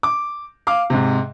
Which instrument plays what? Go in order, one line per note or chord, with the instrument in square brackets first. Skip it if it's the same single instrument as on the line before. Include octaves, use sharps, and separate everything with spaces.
[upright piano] D6
F5 D6
G#2 C3